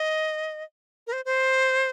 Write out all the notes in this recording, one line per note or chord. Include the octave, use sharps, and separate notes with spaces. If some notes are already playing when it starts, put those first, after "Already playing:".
Already playing: D#5
A#4
C5
C5